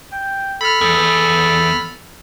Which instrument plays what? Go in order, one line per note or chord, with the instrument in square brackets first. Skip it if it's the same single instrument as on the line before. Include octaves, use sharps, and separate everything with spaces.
[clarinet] G5
[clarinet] A4 [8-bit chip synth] B5 F6
[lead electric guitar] E2 [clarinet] A4